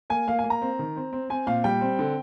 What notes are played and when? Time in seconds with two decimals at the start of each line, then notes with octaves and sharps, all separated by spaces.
0.10 A#3 G#5
0.27 A#3 F5
0.39 G#5
0.44 A#3
0.50 A#5
0.62 C4
0.79 D#3
0.96 C4
1.13 C4
1.30 C4 G#5
1.47 A#2 F5
1.64 G3 G5
1.81 C4
1.99 D3